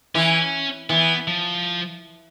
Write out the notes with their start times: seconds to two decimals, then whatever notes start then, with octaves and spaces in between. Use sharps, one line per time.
0.15 E3 C#4
0.90 E3 B3
1.28 F3